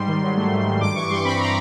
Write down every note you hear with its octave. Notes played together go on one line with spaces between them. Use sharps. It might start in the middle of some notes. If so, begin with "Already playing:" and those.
Already playing: G#2 G3 C6
D#3
F#3
A3
G#2
D#3
G2 D6
E3 C#6
G3 C6
C4 B5
A#5